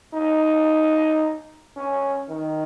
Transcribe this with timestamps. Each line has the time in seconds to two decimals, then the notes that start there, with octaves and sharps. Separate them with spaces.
0.14 D#4
1.77 C#4
2.29 D#3